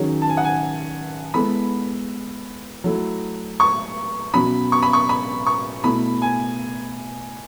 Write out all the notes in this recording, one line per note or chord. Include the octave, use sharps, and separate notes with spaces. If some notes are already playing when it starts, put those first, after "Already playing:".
Already playing: D#3 F#3 C#4 G#4
A5
G#5
F#5
G#5
G#3 B3 E4 A4 B5
F#3 A3 E4 A4
C#6
B2 F#3 C#4 F#4 B5
C#6
B5
C#6
B5
C#6
B2 A3 E4 B5
G#5